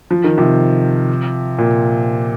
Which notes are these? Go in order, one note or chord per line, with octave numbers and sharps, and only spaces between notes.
F3
D#3
C3 F3
A#2